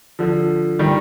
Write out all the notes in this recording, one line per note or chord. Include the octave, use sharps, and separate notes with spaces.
D3 F3
D#3 G3